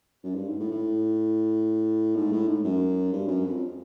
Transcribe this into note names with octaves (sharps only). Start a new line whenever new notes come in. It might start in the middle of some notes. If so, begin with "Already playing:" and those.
F#2
G2
G#2
A2
A2
G#2
A2
G#2
F#2
G2
F#2
F2